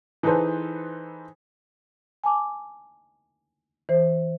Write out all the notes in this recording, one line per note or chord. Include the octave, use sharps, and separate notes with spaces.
E3 D#4 G#4 A4 B4 C5
G#5 A5 D6
E3 C5